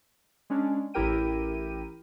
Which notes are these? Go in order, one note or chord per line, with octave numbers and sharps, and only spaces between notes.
G#3 C#4 D4
A1 E4 G4 A#4 G5 D#7